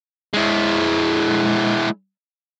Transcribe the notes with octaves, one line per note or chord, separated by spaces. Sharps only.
G#3 E4